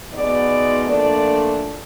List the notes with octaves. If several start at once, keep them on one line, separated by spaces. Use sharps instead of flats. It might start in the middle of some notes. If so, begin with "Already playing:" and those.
B2 G#3 B3 D#4 D5
A#2 F3 A3 D4 D5